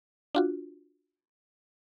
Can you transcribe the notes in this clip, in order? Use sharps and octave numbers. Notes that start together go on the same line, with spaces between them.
D4 F4 F#4